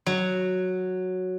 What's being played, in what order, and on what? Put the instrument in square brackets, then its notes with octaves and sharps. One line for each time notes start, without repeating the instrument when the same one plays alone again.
[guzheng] F#3